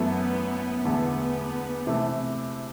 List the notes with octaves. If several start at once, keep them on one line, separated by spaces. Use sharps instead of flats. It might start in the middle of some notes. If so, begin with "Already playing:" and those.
Already playing: F#2 E3 A3 B3 E4 A4
E2 D3 A3 B3
C3 E3 A3